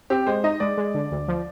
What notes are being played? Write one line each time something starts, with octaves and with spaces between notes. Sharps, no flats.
C4 G4
G#3 C5
D#4 D#5
G#3 D5
G#3
D3
D2
F3